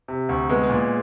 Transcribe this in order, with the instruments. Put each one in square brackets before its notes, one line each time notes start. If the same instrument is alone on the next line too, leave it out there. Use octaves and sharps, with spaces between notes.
[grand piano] C3
D2
[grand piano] G#3 [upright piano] B3
[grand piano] A#2